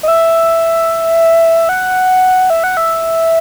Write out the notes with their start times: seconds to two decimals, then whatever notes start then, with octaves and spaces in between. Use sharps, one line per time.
0.03 D#5
0.08 E5
1.69 F#5
2.50 E5
2.64 F#5
2.77 E5